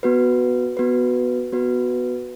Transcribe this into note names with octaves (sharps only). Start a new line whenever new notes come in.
B3 F#4 B4
B3 F#4 B4
B3 F#4 B4